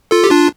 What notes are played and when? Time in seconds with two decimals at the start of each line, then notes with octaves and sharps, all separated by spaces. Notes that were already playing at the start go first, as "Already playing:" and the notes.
0.11 F4 A4
0.24 G4
0.31 D4 F4